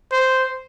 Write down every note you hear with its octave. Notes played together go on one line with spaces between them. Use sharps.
C5